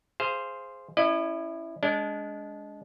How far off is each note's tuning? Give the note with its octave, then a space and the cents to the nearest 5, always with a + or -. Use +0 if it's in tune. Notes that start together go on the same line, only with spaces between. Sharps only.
G#4 +0 C5 +0 F5 -20
C#4 -10 E4 +0 D#5 -45
G#3 +0 D4 -30